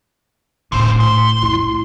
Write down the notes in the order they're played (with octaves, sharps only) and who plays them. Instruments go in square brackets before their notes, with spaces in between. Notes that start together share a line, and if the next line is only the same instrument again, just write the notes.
[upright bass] A2 A3 [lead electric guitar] D3 C5
[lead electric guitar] C6
[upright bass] A3 E4